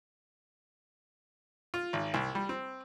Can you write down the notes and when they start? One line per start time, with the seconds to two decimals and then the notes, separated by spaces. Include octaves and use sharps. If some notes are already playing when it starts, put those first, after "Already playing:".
1.74 F4
1.93 G#1
2.14 C2
2.35 G3
2.49 C4